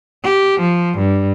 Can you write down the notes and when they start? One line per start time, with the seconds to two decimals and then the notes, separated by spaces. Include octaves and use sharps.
0.24 G4
0.60 F3
0.98 G2